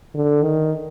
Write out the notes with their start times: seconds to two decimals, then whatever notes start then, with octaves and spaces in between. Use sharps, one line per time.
0.15 D3
0.43 D#3